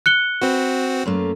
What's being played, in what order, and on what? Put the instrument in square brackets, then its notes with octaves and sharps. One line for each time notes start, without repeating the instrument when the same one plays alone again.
[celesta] F#6 C#7 G7
[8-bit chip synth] C4 F#4 [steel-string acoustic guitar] B4
[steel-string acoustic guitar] F#2 A3 A#3